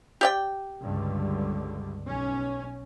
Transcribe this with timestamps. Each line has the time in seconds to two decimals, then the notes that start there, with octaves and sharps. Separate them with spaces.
0.21 G4 D5 G5
0.82 C#2 G2 D3
2.04 B1 C#4